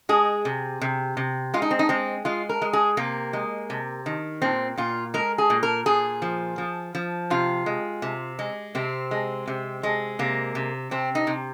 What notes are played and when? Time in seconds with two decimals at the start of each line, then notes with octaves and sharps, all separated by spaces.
0.09 G#3 G#4
0.45 C3
0.82 C3
1.17 C3
1.54 G#3 F4
1.62 D#4
1.71 C4
1.79 D#4
1.89 G#3 C4
2.25 G#3 F4
2.49 A#4
2.62 G#3
2.73 G#4
2.97 C3 A#3
3.33 G#3
3.70 C3
4.06 D#3
4.42 A#2 C4
4.77 A#2 F4
5.14 G#3 A#4
5.38 G#4
5.50 A#2
5.63 A#4
5.86 A#2 G#4
6.22 F3
6.58 F3
6.95 F3
7.30 C3 F4
7.66 G#3
8.02 C3
8.39 G#3
8.75 C3 C4
9.11 G#3
9.47 C3
9.83 G#3
10.19 C3 A#3
10.55 C3
10.91 C3 C4
11.15 D#4
11.27 C3